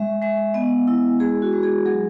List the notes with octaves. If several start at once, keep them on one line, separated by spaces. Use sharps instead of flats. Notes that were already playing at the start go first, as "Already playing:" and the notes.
Already playing: G#3 E5
G#3 E5
B3 D#5
E4
G#3 G#4
F#4
G#3
G#4
F#3 G#4